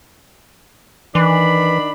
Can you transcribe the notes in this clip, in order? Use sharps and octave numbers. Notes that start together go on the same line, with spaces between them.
D#3 E3 D4 B5